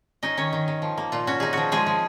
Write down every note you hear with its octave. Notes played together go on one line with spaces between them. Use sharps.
C#4 D#4 D#5
D#3 C#4 C#5
D#3
D#3
F3
A#3
A#2 F4
C#4 F#4
D#4 G#4
F3 F#4
F3 G#3 G#4
F3